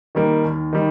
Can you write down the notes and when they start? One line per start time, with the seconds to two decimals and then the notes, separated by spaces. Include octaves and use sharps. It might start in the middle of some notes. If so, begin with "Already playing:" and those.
0.15 D#3 G3 A#3
0.44 D#2
0.73 D#3 G3